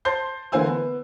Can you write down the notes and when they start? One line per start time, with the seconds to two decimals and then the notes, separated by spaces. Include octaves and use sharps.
0.05 C5 A5 C6 G6 C7
0.52 D3 E3 A#3 C5 G#5 E6
0.66 B3